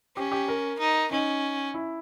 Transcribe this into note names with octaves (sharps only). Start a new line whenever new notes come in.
C#4 G4
G4
A#4
D#4
C#4 D#4
E4